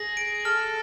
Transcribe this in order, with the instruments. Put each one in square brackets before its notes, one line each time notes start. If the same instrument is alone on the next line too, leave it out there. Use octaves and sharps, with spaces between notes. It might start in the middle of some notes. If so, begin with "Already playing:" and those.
Already playing: [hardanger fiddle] G#4 [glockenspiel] A#6
[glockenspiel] D7
[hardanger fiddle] A4 [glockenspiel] F6